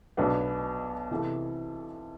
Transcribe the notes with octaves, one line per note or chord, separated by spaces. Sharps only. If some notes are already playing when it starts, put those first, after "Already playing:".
B1 B2 F#3 B3 D4
C3 E3 B3 E4 A4